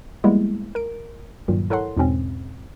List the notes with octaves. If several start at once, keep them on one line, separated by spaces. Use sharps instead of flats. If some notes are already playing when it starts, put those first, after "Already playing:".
F3 G3 G#3 A#3 B3 E4
A#4 D7
G2 A#2 D#3 F#3
E4 A4 A#4 C#5 F#5 C6
E2 G#2 B2 C4 C#4